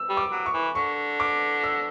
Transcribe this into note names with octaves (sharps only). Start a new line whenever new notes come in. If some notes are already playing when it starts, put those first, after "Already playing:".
Already playing: E6
G3
D6
F#3
C#6
E3
D3 C#6
D6
E6